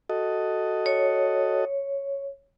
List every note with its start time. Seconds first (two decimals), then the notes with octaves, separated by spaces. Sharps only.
0.10 F#4 A4 D#5
0.86 C#5